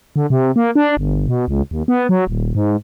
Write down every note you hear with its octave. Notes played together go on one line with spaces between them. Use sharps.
D3
C3
A#3
D4
G1
B2
C#2
D#2
B3
F#3
D#1
G#2